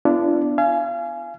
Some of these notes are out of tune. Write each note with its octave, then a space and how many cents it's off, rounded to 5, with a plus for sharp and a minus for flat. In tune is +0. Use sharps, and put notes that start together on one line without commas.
B3 +15 D4 +0 F4 -45
F5 -30 G#5 +15